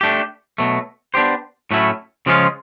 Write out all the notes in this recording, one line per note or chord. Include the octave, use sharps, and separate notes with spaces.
A3 D4 G4
B2 F#3 A3
B3 D4 G4 C5
A2 F#3 A3 C#4 E4
C#3 F3 G#3 C#4 F4